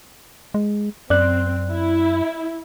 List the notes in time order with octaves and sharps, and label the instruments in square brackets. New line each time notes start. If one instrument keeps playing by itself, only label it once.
[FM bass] G#3
[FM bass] F#2 [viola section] C4 [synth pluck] D5 F#6
[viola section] E4